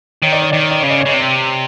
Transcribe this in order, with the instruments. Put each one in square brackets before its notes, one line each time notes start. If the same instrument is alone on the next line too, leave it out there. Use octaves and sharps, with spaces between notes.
[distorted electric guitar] D#3 [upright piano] C#5
[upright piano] D5
C#5
[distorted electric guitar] D#3 [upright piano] D5
[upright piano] C#5
D5
[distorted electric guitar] C#3 [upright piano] C#5
[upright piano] D5
C#5
[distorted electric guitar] C#3 [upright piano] D5
[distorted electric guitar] C3
[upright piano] C#5